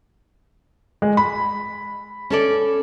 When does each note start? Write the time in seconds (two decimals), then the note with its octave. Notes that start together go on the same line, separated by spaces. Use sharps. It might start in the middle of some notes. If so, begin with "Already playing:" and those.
1.02 G#3
1.17 B5
2.30 C#4 A4 D5